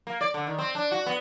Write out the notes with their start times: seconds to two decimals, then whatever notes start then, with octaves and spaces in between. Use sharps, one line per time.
0.07 A#3
0.21 D5
0.34 D3
0.47 D#3
0.59 C4
0.75 D4
0.92 F#4
1.06 B3